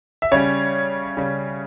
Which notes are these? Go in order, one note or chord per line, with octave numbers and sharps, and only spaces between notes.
E5
C#3 G3 C#4 C#5
C#3 G3 C#4